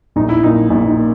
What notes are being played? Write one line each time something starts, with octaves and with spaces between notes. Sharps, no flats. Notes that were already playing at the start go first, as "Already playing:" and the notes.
A#1 D#4
E4
A#2 A#3 D#4
A#1 D#4
D#4
A#3